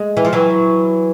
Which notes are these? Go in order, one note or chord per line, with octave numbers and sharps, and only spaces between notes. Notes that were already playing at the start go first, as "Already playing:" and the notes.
Already playing: G#3
E3
F3
E3 F#3